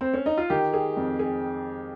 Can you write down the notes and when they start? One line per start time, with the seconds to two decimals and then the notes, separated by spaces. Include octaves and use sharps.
0.01 C4
0.13 C#4
0.26 D#4
0.37 F4
0.50 D#3 G4
0.73 G#4
0.97 F2
1.19 G#4